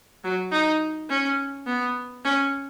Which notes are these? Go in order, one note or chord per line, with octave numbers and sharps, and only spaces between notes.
F#3
D#4
C#4
B3
C#4